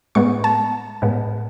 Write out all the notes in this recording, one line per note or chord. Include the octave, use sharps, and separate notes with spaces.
A2 G#3 B3 C#6
A5
A2 G#3 B3